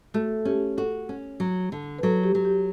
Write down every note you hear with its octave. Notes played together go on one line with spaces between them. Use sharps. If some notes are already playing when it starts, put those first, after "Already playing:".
A3 F#4
C#4 G4
F#4 A4
C#4
F#3
D3
B4
F#3 A4
G4
F#3
G4